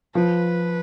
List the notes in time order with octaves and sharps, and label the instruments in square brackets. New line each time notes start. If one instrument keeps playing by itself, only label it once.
[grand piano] F3 [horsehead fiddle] B4